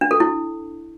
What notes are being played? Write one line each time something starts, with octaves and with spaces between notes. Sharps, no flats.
D4
A4
E4